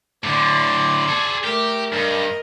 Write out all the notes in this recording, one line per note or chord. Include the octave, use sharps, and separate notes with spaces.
A2 D3 D5 C6
G#4 A4
A3 G4 A#4
G2 A#4 D#5